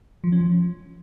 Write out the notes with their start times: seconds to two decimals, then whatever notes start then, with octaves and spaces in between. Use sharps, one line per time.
0.24 F3
0.32 C#4
0.41 F3